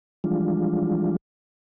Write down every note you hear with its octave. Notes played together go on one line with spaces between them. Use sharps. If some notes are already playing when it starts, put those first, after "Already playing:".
E3 F3 G3 G#3 D4 F4